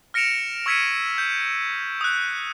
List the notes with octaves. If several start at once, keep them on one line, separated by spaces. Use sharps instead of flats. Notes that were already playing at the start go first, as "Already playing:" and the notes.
F6 A#6 C#7 D7 E7 F7
C#6 E6 G#6 B6 C#7 D#7
G6
D#6 F#6